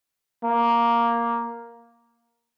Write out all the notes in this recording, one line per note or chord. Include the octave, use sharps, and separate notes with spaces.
A#3